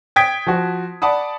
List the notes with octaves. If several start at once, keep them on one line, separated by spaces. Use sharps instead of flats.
G5 D#6 G#6 B6 D7
F3 F#4
D5 F#5 A5 B5 D#6